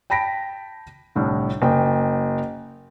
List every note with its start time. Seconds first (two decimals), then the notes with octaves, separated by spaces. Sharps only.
0.10 G5 A5 B5 A#6 B6 D7
1.15 C2 A2 D3
1.62 F#1 G5